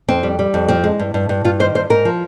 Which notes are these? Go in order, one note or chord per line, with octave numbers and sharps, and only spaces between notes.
F2 C4
G3
G3
F2
F3 C4
G#3
G2
G2
G2
G2 F4
D#3 C5
G2 C5
G#2 A#4
F3